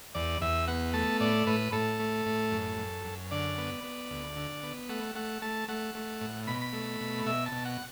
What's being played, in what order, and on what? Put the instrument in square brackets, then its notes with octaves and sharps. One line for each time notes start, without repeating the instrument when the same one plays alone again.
[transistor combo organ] E2 D5
E2 E5
B3 F#5
A3 A5
A2 D5
A2 B4
A2 A4
A3
A2
F#2
F#2
F#2
D3 D5
B3
B3
D2
D3
B3
A3 F#5
A3 F#5
A3 A5
A3 F#5
A3
A2
B2 B5
B5
A3
B2
B2 E5
A5
B2
F#5